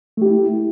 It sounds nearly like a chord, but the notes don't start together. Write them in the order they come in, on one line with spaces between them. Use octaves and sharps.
A3 G4 E4